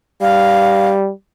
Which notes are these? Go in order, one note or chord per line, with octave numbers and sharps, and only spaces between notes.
G3 F5